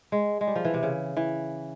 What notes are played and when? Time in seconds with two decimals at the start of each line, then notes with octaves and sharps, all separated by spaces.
0.12 G#3
0.41 G#3
0.47 G3
0.56 F3
0.65 E3
0.74 C3
0.83 C#3
1.17 E3